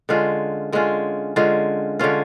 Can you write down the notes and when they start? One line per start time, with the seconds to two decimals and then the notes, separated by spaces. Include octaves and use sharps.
0.09 D3 G#3 C#4 F4
0.73 D3 G#3 C#4 F4
1.36 D3 G#3 C#4 F4
1.99 D3 G#3 C#4 F4